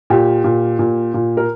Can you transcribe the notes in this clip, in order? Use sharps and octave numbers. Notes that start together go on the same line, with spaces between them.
A#2 G4
A#2
A#2
A#2
A#4